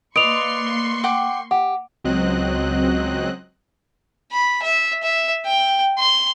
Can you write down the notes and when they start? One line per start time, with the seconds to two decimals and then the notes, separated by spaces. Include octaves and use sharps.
0.16 A#3 B4 D5 D#5 C6 C#6 D7 F7
1.03 F#5 G5 D6
1.51 G4 F#5
2.04 C#2 F#3 C4 D#5 F#6
4.32 B5
4.63 E5
5.03 E5
5.46 G5
5.99 C6